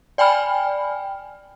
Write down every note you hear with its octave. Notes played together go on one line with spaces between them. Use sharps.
D5 G5 G#5 B5 F6